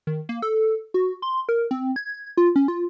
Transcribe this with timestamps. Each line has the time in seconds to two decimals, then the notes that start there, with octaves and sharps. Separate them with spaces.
0.07 D#3
0.29 A#3
0.42 A4
0.94 F#4
1.22 C6
1.49 A#4
1.71 C4
1.96 G#6
2.37 F4
2.56 C#4
2.68 F4